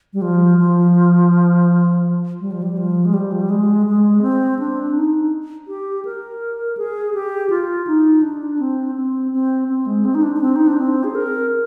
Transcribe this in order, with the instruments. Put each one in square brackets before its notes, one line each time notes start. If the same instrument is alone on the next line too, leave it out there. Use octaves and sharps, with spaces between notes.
[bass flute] G3
F3
F3
G3
F3
G3
F3
G#3
G3
F3
G3
G#3
G#3
C4
D4
D#4
G4
A#4
G#4
G4
F4
D#4
D4
C4
C4
C4
C4
G#3
C4
D#4
D4
D4
C4
D#4
D4
C4
G#4
A#4